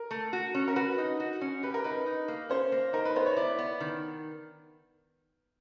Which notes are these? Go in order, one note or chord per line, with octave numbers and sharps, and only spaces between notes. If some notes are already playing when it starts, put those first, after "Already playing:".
Already playing: A#4
A3
F#4
C#4
A#4
F#4 B4
D#4
F#4
C#4
G4 B4
A#4
D#4 B4
D#4
A#3
C#4 C5
A#3
D#4 A#4
B4
B3 C5
C#5
E4 D5
B3
D#3